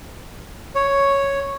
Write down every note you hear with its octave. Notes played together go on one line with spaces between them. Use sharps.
C#5